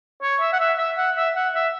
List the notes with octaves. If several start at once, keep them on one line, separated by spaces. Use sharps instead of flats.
C#5
E5
F#5
E5
E5
F#5
E5
F#5
E5